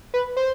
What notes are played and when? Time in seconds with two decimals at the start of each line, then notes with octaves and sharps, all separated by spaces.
0.14 B4
0.37 C5